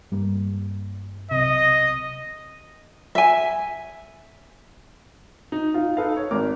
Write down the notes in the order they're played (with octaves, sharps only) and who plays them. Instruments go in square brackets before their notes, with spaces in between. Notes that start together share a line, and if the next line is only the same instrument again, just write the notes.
[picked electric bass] G2 G3 A#3
[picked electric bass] B1 C3 [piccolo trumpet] D#5
[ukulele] E5 G#5
[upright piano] D#4
D#4 F4
D#4 A4 B4 F5
C#5
G#1 A#4 D6